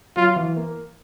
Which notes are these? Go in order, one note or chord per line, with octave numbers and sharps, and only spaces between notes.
F#3 F4
E3
A#3